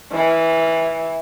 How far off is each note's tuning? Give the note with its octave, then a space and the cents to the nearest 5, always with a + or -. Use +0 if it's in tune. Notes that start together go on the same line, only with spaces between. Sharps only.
E3 -10